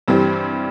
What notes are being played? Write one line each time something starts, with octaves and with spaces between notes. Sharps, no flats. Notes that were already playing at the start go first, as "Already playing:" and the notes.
G2 E3 G3 C4